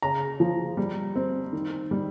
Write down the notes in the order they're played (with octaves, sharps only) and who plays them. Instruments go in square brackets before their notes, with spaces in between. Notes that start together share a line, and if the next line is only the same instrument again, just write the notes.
[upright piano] C#3 A#5
F3
G3
C4
D#3
G3